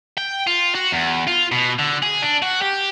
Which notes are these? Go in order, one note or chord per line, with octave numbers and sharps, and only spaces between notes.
G5
F4
F#4
E2
F4
B2
D3
G#4
D4
F#4
G4